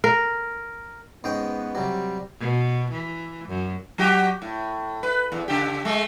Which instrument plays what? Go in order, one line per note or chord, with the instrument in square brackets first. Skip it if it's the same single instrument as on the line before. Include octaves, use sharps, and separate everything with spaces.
[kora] A#4
[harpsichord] G#2 C#4 G5 [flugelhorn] B3
[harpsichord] C3 F#3 [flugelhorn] G3
[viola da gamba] B2
E3
F#2
[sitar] F#3 F#4 G4
A2
B4
E2
C#3 G4
G#3 A3